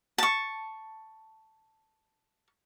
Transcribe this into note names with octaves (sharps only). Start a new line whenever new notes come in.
A5 C#6